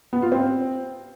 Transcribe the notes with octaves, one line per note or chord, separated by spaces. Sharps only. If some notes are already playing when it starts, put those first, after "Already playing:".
B3
F4
C4